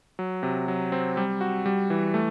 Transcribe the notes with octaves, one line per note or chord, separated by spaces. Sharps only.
F#3
C3
F#3
C4
G3
F#4
G3
E3
A3